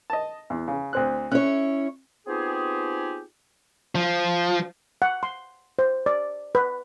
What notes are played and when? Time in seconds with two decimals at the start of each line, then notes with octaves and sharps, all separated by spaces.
0.10 D#5 A5
0.50 E2
0.68 C#3
0.93 D2 C4 F#6
1.32 C#4 E4 C#5 F#6
2.27 B3 C4 D#4 F4 G4 G#4
3.95 F3
5.02 F#5
5.23 C6
5.79 C5
6.06 D5
6.55 B4